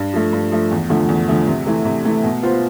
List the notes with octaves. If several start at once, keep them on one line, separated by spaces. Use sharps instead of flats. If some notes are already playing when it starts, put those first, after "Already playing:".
Already playing: G2
F3 A3
G2
F3 A3
E2
D3 F3 A3
E2
D3 F3 A3
C3
E3 A3
C3
E3 A3
B2
B3 F4 C5